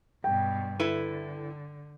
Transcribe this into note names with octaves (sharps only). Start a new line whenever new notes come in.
G2 B2 G5
D3 E4 A4 B4